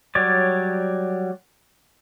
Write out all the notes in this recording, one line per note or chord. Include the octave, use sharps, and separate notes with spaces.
F#3 G3 C#5 D5